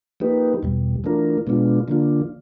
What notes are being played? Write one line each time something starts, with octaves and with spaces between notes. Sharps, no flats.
F3 A#3 D#4 G4 B4
E2 B2 G3
E3 A3 D4 F4 A#4
B2 G#3 B3 D4 F4
D3 F3 A#3 D4 F4